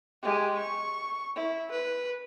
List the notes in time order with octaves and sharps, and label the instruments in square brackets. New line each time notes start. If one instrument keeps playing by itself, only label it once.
[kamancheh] G#3 G4
C#6
E4
B4